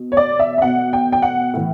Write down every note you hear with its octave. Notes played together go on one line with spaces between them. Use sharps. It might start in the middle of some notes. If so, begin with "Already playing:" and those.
Already playing: B2
C#5
D5
E5
E5
B2 F#5
G5
G5
F#5
A2 E3